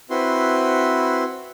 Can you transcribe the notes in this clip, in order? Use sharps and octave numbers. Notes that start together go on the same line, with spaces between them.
C4 E4 F#4 B4 C6